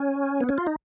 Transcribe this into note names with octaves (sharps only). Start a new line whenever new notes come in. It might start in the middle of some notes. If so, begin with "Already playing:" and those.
Already playing: C#4
B3
C#4
F4
D#4